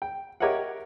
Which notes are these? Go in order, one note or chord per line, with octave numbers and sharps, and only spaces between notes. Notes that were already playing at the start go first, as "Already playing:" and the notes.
G5
G4 A#4 C#5 D#5 E5 F#5